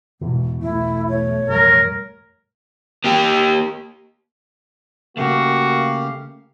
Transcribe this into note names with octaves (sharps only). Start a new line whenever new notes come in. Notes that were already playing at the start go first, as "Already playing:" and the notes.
E2 G#2 B2 E3
B1 A3 E4
C#5
A1 F2 G3 A#4
A#3 G4
C#3 A3 A#3 F#4 G4 F5